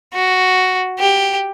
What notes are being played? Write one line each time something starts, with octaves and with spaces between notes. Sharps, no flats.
F#4
G4